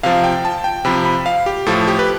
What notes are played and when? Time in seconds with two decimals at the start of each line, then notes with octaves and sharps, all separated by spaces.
0.03 C3 F3 F5
0.24 G5
0.45 A5
0.64 G5
0.85 C3 F3 B5
1.05 B5
1.26 F5
1.46 G4
1.66 A2 F3 A4
1.88 G4
1.99 B4